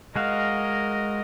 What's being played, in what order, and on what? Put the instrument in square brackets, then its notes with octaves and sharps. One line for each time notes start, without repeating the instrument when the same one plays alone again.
[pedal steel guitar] G#3 F#4 F5 [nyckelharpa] A#4 D#5